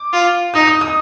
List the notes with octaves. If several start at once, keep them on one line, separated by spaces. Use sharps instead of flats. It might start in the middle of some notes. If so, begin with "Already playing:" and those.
Already playing: D6
F4
D#4 D#6
D#6
D#6